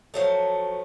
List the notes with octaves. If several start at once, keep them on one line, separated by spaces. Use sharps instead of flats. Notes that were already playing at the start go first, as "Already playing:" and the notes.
F3 F#3 A3